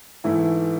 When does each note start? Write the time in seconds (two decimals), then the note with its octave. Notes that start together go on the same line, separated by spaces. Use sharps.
0.24 G#2 E3 A3 E4